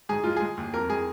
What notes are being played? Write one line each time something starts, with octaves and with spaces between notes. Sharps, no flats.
G#2 G#4
G#3 F4
G#3 G#4
D#2
F2 A#4
G#3 G#4